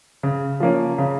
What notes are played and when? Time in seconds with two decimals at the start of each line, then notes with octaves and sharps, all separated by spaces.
0.23 C#3
0.60 F3 A#3 C#4
0.98 C#3